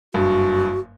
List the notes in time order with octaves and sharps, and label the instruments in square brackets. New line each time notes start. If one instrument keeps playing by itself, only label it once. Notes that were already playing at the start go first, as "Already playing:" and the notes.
[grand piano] F#1 G2 [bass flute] F#4